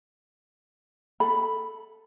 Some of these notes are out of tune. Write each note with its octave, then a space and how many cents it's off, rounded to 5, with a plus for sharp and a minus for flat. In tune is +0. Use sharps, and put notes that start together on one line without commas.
A4 +0 B5 +0